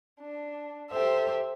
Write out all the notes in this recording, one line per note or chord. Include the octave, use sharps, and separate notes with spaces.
D4
G4 A4 C5 E5